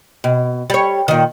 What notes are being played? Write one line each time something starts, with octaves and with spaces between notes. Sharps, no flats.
B2
G3 C#5
A#2 D#3